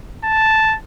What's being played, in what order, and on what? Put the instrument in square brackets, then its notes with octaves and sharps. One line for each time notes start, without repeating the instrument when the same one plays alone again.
[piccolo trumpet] A5